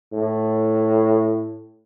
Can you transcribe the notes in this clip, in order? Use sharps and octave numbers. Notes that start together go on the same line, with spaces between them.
A2